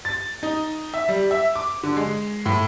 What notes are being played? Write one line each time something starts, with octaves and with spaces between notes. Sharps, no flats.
A6
D#4
E5
G3
E5
D6
D3
G#3
A2